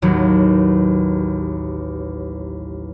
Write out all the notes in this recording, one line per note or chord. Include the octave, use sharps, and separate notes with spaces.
A1 D#2 F#3